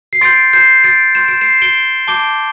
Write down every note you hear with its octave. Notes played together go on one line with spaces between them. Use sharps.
C7
C6 G6 A6 D7
G6 C7
A6 D7
C6 G6 E7
D7
C7 E7
D7 G7
A5 D6 G6 D7 G7